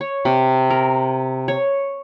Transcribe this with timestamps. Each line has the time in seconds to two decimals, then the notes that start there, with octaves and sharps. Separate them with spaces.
0.01 C#5
0.25 C3
0.70 A#4
1.48 C#5